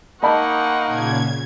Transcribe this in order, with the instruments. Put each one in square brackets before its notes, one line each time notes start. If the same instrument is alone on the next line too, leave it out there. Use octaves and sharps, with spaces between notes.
[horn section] A#3 D#4 [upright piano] D#5 A5 B5 [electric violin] F#5 C#6
[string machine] A#2 C#3 G#6